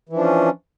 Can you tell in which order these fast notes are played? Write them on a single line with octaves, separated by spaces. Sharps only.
E3 F3 D4 C#4